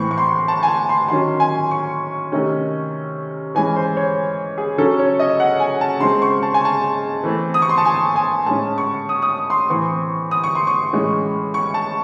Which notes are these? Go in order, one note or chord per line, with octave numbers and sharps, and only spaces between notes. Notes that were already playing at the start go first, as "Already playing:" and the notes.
Already playing: A2 E3 C4 C#6
C#6
C6
A5
G#5
A5
C6
D#3 F#3 C#4 C6
G#5
C#6
C3 D#3 A3 C#4
E3 G#3 C#4 G#5
C5
C#5
G#4
C#3 F#3 C#4 A4
C#5
D#5
F#5
G#5
A5
C#3 G#3 C4 C6
C#6
A5
G#5
A5
E3 A3 C4
D#6
C#6
C6
A5
G#5
G#5
A2 G#3 C#4 A5
C#6
D#6
D#6
C#6
C6
A2 E3 C4 C#6
D#6
C#6
C6
C#6
A2 E3 G#3 C#4
C#6
A5